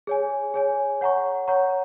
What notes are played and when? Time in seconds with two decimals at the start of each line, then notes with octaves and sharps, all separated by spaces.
0.07 G#4 C#5 G#5
0.54 G#4 C#5 G#5
1.01 C#5 F#5 A#5 C#6
1.48 C#5 F#5 A#5 C#6